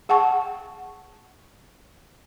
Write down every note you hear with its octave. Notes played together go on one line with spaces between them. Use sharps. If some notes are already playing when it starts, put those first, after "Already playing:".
G#4 F#5 G5 A5 C#6